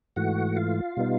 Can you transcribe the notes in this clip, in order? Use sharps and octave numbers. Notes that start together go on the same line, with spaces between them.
G#2 E3 A3 F#4 F#5
F4 F5
B2 G3 B3 D#4